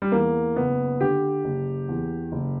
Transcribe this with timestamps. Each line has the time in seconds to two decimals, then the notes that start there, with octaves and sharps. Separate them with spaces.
0.02 G3
0.12 E2 A#3
0.56 F#1 B3
1.01 D3 G4
1.44 F#1
1.89 E2
2.32 F#1